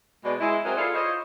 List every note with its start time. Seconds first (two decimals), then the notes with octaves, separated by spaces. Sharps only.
0.25 B2 G#3 D5
0.40 G#3 E4
0.65 F#3 C4 E4 G#4 A#4 C5
0.77 E4 F4 G#4 A4 D5 F5
0.95 E4 F4 C5 C#5 D#5